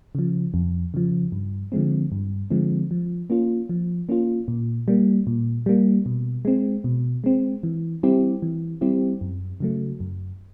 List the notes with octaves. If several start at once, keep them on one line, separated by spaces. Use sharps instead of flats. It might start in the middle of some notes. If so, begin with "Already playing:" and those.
C#3 F3
F2
C#3 F3
G2
D3 F3 G#3 C4
G2
D3 F3 G#3 C4
F3
A#3 C#4 F4
F3
A#3 C#4 F4
A#2
G3 A#3
A#2
G3 A#3
B2
G#3 C4
B2
G#3 C4
E3
G3 C4 E4 G4
E3
G3 C4 E4 G4
F#2
C#3 F#3 A3
F#2